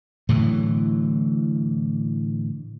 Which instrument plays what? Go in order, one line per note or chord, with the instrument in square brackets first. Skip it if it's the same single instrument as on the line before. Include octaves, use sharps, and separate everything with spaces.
[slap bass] A2 D3 E3 F#3